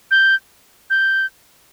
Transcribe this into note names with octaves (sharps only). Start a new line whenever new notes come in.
G6
G6